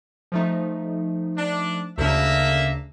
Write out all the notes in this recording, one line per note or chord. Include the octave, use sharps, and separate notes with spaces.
F3 A3 D#4
D4
D2 C#3 A#3 D4 E5